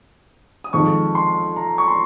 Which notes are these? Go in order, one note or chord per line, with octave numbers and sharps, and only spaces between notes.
D#6
F2 D#3 G#3 C#6
C6
A#5
C#6
C6